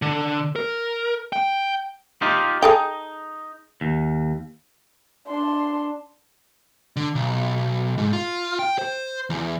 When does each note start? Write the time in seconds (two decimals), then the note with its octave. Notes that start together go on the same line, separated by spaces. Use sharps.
0.02 D3
0.56 A#4
1.33 G5
2.22 D#4 F4 G4
2.62 D#4 G#4 A4 G5
3.81 D#2
5.28 D4 C6
6.96 D3
7.15 B1
7.98 G#2
8.13 F4
8.59 G5
8.79 C5
9.30 E2